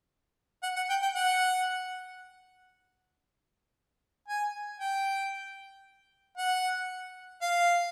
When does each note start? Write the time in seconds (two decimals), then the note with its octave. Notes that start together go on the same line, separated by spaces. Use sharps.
0.63 F#5
0.76 F#5
0.90 G5
1.02 G5
1.15 F#5
4.28 G#5
4.80 G5
6.38 F#5
7.42 F5